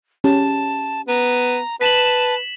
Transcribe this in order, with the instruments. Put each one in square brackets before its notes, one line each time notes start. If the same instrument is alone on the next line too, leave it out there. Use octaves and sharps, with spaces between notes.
[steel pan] C#4 G4 [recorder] A5
[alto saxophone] B3 [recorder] A#5
[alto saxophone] B4 [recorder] A5 [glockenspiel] B6 E7 F#7